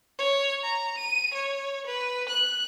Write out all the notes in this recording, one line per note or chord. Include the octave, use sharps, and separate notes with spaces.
C#5
A#5
D#7
C#5
B4
F#6